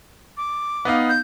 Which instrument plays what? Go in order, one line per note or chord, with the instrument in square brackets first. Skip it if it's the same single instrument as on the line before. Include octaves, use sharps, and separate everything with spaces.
[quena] D6
[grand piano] B3 D#4 F5
[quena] G6